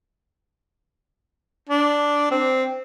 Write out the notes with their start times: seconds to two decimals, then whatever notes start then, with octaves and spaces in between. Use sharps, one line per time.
1.69 D4
2.31 C4